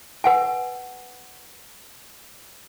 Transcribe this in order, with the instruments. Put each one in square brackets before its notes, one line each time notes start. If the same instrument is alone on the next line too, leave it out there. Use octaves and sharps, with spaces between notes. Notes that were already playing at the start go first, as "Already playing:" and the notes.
[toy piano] B4 F#5 G#5